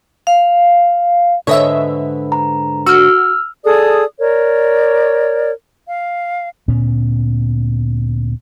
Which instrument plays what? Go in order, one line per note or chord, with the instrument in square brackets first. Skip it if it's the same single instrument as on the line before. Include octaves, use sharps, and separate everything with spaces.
[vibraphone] F5
[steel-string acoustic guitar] G#2 D3 B4 [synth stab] C#5 D#5 E5
[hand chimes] A#5
[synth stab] F#4 [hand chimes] E6 F6
[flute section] G#4 A4 D5 D#6
A#4 C#5 D5
F5
[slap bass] D2 A#2 B3 C#4